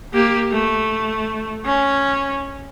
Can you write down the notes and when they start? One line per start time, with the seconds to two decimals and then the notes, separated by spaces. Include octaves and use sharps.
0.14 A#3 G4
0.51 A3
1.65 C#4